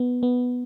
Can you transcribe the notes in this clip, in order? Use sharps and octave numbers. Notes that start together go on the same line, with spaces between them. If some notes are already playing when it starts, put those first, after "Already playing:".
Already playing: B3
B3